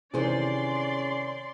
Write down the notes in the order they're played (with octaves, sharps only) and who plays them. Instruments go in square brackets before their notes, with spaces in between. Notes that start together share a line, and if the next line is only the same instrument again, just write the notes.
[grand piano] C3 D#3 E3 [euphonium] C#4 [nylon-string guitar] G#4 C5 [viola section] D5 C6